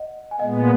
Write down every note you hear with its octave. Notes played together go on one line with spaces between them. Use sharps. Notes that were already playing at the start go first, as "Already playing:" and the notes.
Already playing: D#5 F#5
G#5
A#2 G#3 B3 D#5 F#5